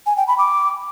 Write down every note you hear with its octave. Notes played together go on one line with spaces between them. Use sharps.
G#5
G5
B5
D6